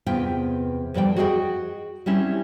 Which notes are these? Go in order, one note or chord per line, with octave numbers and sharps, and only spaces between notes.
E2 C3 B3 F4 G5
F2 E3 G3 D5 G5
F#4 G#4 D#5 G5
G3 C4 C#4 E4